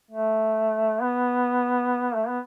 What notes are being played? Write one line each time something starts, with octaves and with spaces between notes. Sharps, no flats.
A3
B3
A3
B3